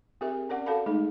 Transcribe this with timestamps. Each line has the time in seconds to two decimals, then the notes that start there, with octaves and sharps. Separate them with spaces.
0.21 C4 G4 G#4 A#4 E5
0.49 C#4 A#4 D5 F#5
0.66 F#4 A4 D5 F5 A5 B5
0.86 G#3 A3 D#4 G#4